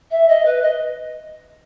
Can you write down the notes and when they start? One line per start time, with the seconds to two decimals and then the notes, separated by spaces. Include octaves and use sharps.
0.10 E5
0.28 D#5
0.45 B4
0.62 D#5